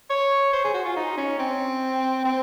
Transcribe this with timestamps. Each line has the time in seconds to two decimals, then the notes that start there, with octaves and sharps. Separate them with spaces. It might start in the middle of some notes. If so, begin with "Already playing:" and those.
0.10 C#5
0.53 C5
0.64 G#4
0.74 F#4
0.85 F4
0.96 D#4
1.17 C#4
1.39 C4
2.25 C4